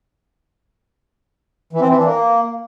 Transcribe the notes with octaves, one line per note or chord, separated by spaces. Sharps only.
E3
C4
E3
D4
A#3